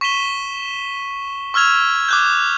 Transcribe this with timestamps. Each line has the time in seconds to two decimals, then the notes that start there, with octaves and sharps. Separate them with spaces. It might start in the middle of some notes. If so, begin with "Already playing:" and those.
0.01 C#6 B6 D#7 E7 G7
1.54 C#6 E6 F6 G#6 F7
2.09 D6 F#6 G6